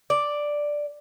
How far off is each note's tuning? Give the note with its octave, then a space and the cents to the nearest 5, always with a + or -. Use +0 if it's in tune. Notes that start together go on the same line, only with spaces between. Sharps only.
D5 +0